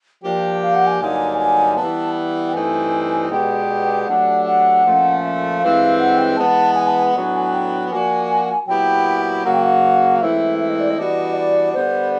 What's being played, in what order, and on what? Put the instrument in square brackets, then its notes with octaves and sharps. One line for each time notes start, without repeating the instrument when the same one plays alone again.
[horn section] F3 A#3 D4 G4 [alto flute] G5
[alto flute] F5
F#5
G#5
[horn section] G2 D3 F#3 A#3 D#4 [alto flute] G#5
[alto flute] G#5
[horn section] E3 G3 B3 [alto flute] A5
[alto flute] G5
[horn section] G2 E3 A3 C4 D#4 [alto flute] G#5
[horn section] B2 G#3 B3 D4 G4 [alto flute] G5
[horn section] F#3 A3 D4 G4 [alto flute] F#5
[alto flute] F#5
[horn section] A#2 F3 A3 C#4
[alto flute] E5
[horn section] G2 E3 G#3 C4 [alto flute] F5
[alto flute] F#5
G5
[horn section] E3 G#3 B3 [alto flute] A5
[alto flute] G#5
A5
G#5
[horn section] A2 F#3 B3 D4
[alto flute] G5
[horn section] F3 A#3 D4 F#4 [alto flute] G#5
[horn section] A#2 F#3 B3 E4 G4 [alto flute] G5
[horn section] C#3 F#3 A#3 [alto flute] F#5
[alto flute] G5
F#5
F5
[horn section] G#2 E3 A3 C4 E4 [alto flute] E5
[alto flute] E5
D#5
D5
D#5
[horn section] E3 G3 B3 D4 F#4
[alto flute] D5
[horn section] D3 G3 B3 [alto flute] C5